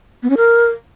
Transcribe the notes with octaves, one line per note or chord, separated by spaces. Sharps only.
B3
C#4
A#4